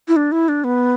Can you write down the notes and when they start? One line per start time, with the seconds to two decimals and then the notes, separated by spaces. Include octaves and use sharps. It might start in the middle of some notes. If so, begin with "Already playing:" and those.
0.08 E4
0.16 D4
0.32 E4
0.49 D4
0.64 B3